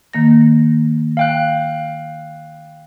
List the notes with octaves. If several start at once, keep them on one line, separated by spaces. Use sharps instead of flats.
D#3 A#3 A#6
F5 G5 F#6